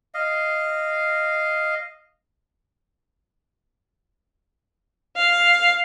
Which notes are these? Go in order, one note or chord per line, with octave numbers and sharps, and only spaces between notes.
D#5 F5
F5